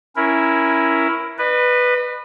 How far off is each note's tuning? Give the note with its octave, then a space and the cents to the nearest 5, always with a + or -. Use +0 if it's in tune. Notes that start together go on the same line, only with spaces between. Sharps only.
C#4 +0 E4 +0 A#4 +10
B4 +0 D#5 -45